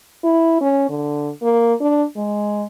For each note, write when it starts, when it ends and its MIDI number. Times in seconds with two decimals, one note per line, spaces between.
0.24 0.58 64
0.61 0.88 61
0.89 1.30 50
1.42 1.74 58
1.81 2.04 62
2.16 2.66 56